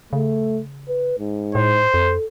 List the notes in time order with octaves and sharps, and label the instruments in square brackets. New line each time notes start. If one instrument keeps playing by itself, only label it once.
[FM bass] C#3 [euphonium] A3
[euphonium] B4
G#2
[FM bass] A2 [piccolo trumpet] C5
[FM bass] F2 [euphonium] A4